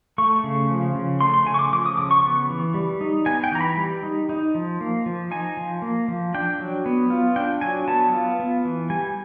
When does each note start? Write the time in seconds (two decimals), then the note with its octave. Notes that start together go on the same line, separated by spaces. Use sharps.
0.18 A3 C#6
0.44 C#3
0.70 F3
0.95 C#3
1.21 A3 C6
1.34 C6
1.46 C#3 G#5
1.54 C#6
1.59 D6
1.73 F3 D6
1.86 D#6
1.97 C#3 D6
2.11 C#6
2.23 B3
2.50 E3
2.74 G3
3.01 D#4
3.26 B3 G#5
3.44 G5
3.52 E3 A#5
3.61 B5
3.77 G3
4.03 D#4
4.29 D#4
4.55 F3
4.81 A#3
5.06 F3
5.31 D#4 G#5
5.57 F3
5.82 A#3
6.08 F3
6.34 D4 G5
6.59 F#3
6.86 B3
7.10 F4
7.36 D4 G5
7.61 F#3 G#5
7.88 B3 A5
8.13 F4
8.40 B3
8.65 E3
8.90 G3 G#5